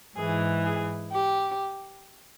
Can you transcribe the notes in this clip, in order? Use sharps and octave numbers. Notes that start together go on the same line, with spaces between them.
G#2 E3 G#4
G#4
G4